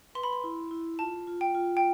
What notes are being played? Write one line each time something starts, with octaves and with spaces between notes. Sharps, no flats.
B4 C6
B5
C6
E4
E4
F4 A5
F4
G5
F4
G5